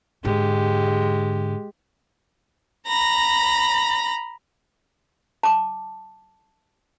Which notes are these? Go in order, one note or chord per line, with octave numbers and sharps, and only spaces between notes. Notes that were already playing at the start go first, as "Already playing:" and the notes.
G#2 D3 G#3 G4
A#5 B5 A#6
A5 D6